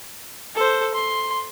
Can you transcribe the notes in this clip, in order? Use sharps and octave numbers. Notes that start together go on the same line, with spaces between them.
A4 C5
C6